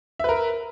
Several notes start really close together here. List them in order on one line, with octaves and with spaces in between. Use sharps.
E5 B4 A#4